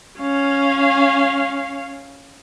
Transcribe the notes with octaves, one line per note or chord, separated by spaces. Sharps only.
C#4 F5